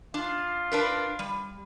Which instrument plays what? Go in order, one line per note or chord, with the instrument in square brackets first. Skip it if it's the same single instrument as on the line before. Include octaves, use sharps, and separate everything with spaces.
[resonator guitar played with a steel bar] D4 [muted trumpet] F4
[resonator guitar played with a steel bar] D4 A#4 B4
G3